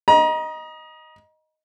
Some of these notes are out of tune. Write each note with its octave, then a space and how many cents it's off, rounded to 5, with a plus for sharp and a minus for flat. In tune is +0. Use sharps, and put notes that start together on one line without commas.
D#5 +0 A#5 +35